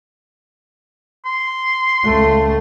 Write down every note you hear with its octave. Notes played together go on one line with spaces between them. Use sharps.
C6
C#2 A3